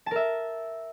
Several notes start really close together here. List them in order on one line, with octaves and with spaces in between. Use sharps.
A5 A#4 E5